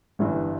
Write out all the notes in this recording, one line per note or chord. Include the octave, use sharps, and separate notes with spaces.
G1 G2 E3